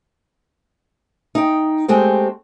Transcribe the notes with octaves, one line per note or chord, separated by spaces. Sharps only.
D#4 G5
G#3 A3 C4 G4